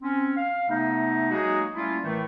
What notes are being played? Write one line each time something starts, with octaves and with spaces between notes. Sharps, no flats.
C4 C#4
F5
C3 A3 B3 D#4
F#3 G#3 A#3 D#4 F#4 G#4
G3 A3 A#3 C#4 E4 F4
A2 D#3 E3 A3